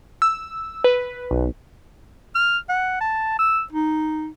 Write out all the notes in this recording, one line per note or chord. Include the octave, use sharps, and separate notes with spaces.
E6
B4
B1
F6
F#5
A5
E6
D#4